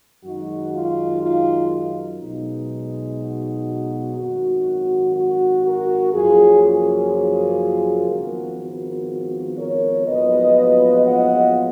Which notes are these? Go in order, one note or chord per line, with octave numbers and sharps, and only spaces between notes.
F#2 D#3 G#3 D#4 F#4
F4
F4
B1 B2 G#3 D#4
F#4
G#1 F#2 D#3 F#4
F#4
F#4 A#4
F#2 C#3 F3 A#3 C#4 F4 G#4
F4 G#4
F4 G#4
G#1 G#2 F3 B3 F#4 A#4
F#4 A#4
A#4 C#5
A#1 G#2 F#3 B3 F4 B4 D#5
D#5 F#5